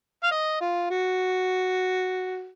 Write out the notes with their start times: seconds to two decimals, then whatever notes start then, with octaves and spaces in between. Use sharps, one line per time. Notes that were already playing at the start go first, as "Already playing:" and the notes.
0.24 F5
0.31 D#5
0.61 F4
0.90 F#4